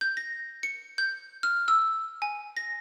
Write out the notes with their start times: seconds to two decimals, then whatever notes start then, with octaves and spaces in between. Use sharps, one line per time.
0.01 G6
0.17 A#6
0.63 C#7
0.98 G6
1.43 F6
1.68 E6
2.22 G#5
2.57 A#6